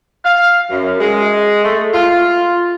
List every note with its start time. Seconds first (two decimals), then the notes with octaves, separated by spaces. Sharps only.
0.25 F5
0.71 F#2
1.00 G#3
1.64 A3
1.94 F4